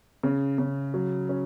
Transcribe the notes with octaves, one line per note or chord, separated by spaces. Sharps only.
C#3
C#3
F#3
C#4